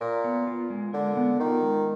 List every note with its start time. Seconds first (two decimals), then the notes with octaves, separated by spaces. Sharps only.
0.01 A#2 A#4
0.24 B3
0.47 F4
0.70 G#3
0.93 D3 A#4
1.17 B3
1.40 D#3 F4
1.63 G#3